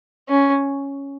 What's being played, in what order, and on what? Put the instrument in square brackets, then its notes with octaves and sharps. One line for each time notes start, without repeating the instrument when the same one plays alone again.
[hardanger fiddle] C#4